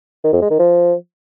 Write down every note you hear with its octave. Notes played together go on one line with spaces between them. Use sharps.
D#3
F2
G#3
D#3
F3